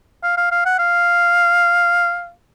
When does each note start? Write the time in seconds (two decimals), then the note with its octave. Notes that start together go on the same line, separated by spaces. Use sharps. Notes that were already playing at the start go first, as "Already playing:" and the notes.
0.23 F5
0.37 F5
0.51 F5
0.65 F#5
0.79 F5